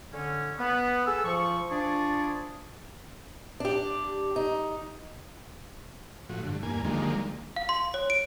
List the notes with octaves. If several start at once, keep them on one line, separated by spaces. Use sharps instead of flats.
D3 C#4
B3
G#4 A4 E6
F3 C#6
F3 D4 G#4 D5 C#6
D4 G4
D#4
A2 F3 F#4
G2 D3
E2 G2 A#3 G#5
D3 D#3 F3 G3 G#3 A#3
F5
C6
C#5
D7